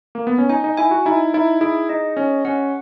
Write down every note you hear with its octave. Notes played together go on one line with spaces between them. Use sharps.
A#3
B3
C#4
D#4 G#5
D#4
E4 G#5
F#4
D#4 E4
D#4 E4
E4 G#4
D#4 D#5
C#4 G#4
C#4 F#5